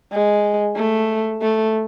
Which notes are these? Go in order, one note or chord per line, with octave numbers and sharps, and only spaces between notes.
G#3
A3
A3